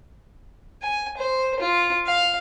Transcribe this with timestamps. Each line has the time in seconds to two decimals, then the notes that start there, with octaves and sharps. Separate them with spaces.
0.82 G#5
1.17 C5
1.59 F4
2.06 F5